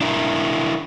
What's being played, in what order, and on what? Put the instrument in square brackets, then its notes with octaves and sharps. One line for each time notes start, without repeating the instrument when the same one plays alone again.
[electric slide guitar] D4 E4 A#4